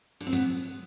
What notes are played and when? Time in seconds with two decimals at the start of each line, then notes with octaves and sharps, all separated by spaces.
0.21 D3
0.27 C4
0.33 B3